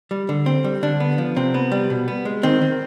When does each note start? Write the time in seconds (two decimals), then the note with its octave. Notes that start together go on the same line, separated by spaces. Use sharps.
0.11 G3
0.29 D3
0.46 C4
0.64 G3
0.83 D3 D4
1.00 B3
1.18 F3
1.36 C3 C4
1.54 B3
1.72 G3
1.90 B2
2.08 B3
2.25 G#3
2.43 D#3 C4
2.61 D#3